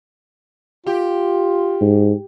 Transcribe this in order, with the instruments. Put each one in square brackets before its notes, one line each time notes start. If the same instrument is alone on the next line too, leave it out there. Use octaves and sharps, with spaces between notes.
[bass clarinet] F4 [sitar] G4
[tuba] G#2